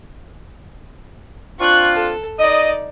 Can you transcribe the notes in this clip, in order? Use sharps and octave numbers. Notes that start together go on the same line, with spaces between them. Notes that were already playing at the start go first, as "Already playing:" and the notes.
C4 D4 F4 C#6 F#6
A4
D#4 D5 D#5